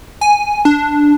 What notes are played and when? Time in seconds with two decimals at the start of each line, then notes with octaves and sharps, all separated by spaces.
0.21 G#5
0.65 D4